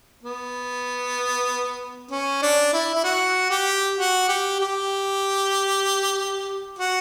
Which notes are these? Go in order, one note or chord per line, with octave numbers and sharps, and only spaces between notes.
B3
C#4
D4
E4
E4
F#4
G4
F#4
G4
G4
F#4